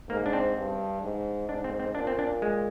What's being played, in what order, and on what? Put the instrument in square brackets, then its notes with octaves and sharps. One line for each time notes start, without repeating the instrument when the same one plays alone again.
[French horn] G#2 [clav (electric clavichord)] A#3
[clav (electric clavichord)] D4
C4
[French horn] G2
G#2
[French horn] G#2 [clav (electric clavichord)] D4
[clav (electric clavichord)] C4
C4
[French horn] A#2 [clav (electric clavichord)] D4
[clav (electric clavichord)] C4
D4
G#3